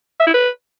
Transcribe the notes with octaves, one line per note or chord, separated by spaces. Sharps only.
E5
E4
B4